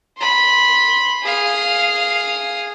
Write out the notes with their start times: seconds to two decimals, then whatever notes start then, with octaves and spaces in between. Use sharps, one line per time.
0.18 B5 C6
1.22 G#4 F5